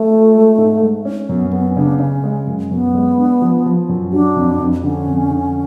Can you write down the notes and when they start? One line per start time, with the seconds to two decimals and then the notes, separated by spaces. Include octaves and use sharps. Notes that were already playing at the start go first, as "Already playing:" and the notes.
Already playing: A3
0.11 F4
0.34 G#3
0.58 G#2
0.82 G#3
1.05 C#4
1.29 F#2 B3
1.53 B3 C#4
1.77 C#3 D4
2.00 C#3 C#4
2.24 G#3
2.47 F#2
2.71 F#2 B3
2.95 G#3
3.18 D4
3.42 F3
3.66 F3
3.89 F#2
4.13 F#3 D4
4.36 F2
4.60 F2
4.84 D3 C#4
5.07 F2
5.31 D3